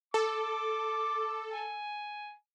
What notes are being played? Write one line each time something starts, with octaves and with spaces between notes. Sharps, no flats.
A4 D6
G#5